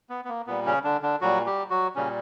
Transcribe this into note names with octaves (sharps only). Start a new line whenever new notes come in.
B3
B3
A#3
A#2 G3 B3
C#3 C#4
D3 D4
D3 D4
A#2 F#3 G3 F#4
G3 G4
F#3 F#4
A#2 C#3 G3 C#4